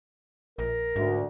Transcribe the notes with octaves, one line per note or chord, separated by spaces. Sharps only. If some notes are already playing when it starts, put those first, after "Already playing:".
A#1 A#4
D2 G#2